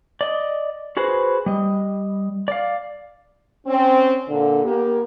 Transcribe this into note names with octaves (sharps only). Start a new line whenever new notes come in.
D5 D#5
F#4 G#4 B4 C5
G3 D#5
D5 F5
C4 C#4
A#2 D3
A#3 B3 G4